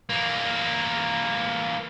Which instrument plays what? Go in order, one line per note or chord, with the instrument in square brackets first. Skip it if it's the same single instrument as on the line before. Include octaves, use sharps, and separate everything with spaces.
[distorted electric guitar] E3 A#3